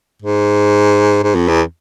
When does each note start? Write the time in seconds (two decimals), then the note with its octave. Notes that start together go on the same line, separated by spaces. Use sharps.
0.22 G#2
1.23 G#2
1.35 F2
1.48 E2